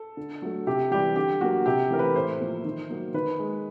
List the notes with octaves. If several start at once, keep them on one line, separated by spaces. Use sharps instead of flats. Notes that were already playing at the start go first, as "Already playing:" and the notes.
Already playing: A4
D3
F#3 A3
C3 G4
E3 G3 G4
D3 G4
F#3 A#3 F#4
C3 G4
E3 A3 A#4
B4
A2 C5
F3 A#3
D#3
F#3 A#3
D#3 B4
G#3